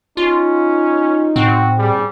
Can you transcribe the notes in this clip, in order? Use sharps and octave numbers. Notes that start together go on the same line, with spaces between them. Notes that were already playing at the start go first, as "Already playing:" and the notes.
C#4 D#4 F4
A2 C4 F#4
G3 G#4